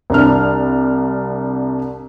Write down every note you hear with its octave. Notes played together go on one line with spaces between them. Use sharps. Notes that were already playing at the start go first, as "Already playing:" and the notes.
C2 D4 F6